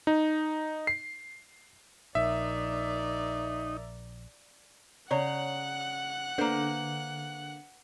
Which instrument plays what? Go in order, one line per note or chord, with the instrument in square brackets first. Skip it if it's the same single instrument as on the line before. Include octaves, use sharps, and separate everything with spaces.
[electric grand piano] D#4
C7
[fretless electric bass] A#1 [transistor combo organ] D#4 [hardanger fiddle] A#4 D5 [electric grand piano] E5
[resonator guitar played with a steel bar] C#3 A#5 [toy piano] C#5 D5 [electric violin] F#5 F#6
[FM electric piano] D3 [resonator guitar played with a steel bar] A#3 C5 [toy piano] B4